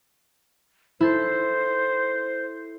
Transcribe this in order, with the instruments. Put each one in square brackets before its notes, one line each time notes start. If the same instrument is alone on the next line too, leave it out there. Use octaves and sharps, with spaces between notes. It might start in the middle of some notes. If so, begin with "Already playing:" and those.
[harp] E4 A4 [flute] C5